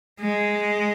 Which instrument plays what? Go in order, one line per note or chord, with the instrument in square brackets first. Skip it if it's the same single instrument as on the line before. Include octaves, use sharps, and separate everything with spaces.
[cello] G#3